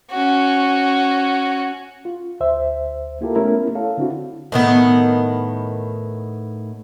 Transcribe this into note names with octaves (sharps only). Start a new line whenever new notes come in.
C#4 F#4
F4
D2 C5 E5
A#3 E4 F4 G4 A4 A#4
A3 B3 C#4 E4 A#4
A4 C#5 F5
D3 C4 D4 E4 F#4
A2 D#3 B3